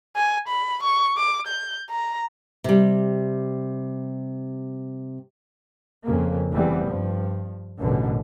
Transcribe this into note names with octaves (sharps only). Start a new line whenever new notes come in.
G#5
B5
C#6
D6
G6
A#5
C3 G3
F2 C#3 A#3
F1 E2 E3 G3 B3 C4
G2 F3
A1 F#2 B2 D3